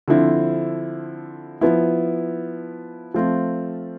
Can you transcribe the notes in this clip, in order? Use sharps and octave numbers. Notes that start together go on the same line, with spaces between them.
D3 F3 C4 E4
F3 B3 E4
F3 A3 C4 F4